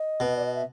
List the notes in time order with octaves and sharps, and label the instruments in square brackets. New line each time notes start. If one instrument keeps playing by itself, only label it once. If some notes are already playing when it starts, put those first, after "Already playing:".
Already playing: [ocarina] D#5
[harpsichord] B2
[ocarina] D5
D#5
E5